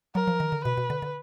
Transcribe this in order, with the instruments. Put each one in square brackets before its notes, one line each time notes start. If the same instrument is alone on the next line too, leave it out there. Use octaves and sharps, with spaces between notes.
[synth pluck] F#3 [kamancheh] A#4
[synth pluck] F3
D#3
D3
[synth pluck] B2 [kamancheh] B4
[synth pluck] B2
D3
D3